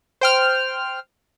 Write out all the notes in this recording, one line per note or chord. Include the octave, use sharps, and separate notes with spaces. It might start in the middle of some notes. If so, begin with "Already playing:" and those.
C5 G5 F6